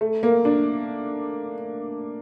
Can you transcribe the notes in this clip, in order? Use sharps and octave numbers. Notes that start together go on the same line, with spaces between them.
A3
A#3
D4